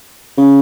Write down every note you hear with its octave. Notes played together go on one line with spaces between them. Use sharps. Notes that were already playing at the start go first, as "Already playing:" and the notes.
C#3